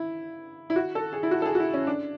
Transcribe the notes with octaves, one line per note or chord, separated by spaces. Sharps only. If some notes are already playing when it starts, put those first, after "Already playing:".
Already playing: E4
E4
F#4
A4
G#4
E4
F#4
A4
G#4
F#4
E4
C#4
D4